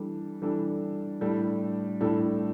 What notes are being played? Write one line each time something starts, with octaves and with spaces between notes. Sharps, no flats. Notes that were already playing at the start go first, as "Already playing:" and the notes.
Already playing: E3 G3 D4 A4
E3 G3 D4 A4
A2 G3 D4 A4
A2 G3 D4 A4